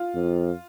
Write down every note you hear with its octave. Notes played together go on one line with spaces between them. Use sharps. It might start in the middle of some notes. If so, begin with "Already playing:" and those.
Already playing: F4
F2